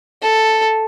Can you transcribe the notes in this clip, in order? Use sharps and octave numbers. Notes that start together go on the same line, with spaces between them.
A4